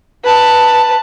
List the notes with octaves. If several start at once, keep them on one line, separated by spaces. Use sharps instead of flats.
B4 A5